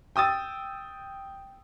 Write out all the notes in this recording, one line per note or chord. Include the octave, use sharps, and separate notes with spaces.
G5 D#6 E6 A6